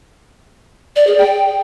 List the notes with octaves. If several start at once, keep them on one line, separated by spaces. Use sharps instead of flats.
D5
G#4
G5